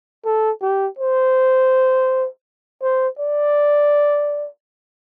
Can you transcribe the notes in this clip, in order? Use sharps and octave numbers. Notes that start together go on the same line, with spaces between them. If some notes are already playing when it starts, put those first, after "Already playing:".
A4
G4
C5
C5
D5